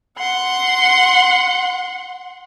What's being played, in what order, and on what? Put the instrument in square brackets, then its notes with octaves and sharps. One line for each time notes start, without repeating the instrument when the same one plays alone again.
[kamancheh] F#5 C6